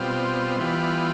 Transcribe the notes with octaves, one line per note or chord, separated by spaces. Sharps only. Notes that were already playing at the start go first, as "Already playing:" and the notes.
Already playing: B2 G3 C4 F4
E3 G3 B3 F4